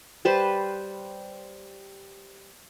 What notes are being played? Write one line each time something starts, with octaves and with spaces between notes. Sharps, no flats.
G3 B4 C5 A5